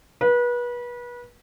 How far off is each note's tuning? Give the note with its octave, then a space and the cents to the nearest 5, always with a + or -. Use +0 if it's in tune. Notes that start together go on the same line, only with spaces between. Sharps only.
B4 -30